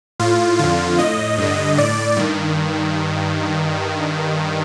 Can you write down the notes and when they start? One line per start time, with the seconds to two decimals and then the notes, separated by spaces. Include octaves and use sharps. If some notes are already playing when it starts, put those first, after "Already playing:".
0.19 A2 F4
0.59 F2 D3 F4
0.99 A2 D#5
1.38 G2 D3
1.77 A2 D5
2.17 G2 D#3